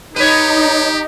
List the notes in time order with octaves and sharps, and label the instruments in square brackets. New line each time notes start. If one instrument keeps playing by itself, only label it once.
[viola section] D#4 [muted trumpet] G4 [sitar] B4 C#5